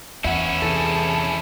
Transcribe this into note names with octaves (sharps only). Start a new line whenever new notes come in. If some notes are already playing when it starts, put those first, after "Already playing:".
E2 C#4 E4 E5 F#5
C3 E3 G#4 A4 A5